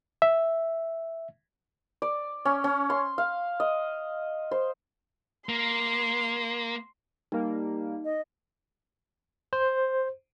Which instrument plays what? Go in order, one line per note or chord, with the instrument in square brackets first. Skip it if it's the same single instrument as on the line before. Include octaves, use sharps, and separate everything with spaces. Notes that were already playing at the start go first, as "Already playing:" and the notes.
[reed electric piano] E5
[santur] D5
C#4
C#4
C6
F5
D#5
C5
[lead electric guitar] A#3 [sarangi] C6
[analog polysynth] G3 A#3 [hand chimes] D#4
[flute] D#5
[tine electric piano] C5